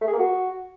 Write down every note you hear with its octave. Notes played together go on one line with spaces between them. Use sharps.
A3
G#4
A#3
F#4